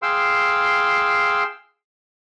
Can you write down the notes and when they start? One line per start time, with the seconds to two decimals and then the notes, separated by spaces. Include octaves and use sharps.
0.02 G#4 F5 G5 C6 E6